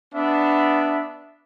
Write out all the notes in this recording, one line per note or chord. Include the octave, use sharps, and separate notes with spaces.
B3 D4 E5